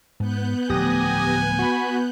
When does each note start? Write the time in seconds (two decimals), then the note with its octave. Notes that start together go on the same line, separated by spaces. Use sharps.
0.20 G#2 B3 F#6 G6
0.69 D1 F3 A3 G4 G#5 D#6 A#6
1.59 F#4 B5